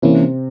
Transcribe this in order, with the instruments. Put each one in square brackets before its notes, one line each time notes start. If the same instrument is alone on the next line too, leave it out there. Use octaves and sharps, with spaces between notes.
[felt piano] C3 C4 [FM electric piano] E3 A#3 C#4 E4